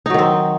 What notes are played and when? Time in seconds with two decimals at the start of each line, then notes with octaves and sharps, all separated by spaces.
0.06 D#4
0.10 F#3
0.14 D#3
0.19 C4